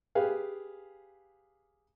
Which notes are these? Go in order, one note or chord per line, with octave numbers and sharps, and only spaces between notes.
G4 G#4 B4 F5